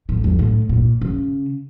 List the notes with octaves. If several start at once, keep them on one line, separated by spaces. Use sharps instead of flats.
A2
F2
A2
A#2
C#3